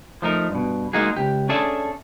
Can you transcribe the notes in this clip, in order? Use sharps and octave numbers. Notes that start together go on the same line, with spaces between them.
F3 A3 D#4 A#4
G2 B2
G#3 A#3 D#4 F#4 G#4
C#2 G4
C#4 D4 G#4 A4 E5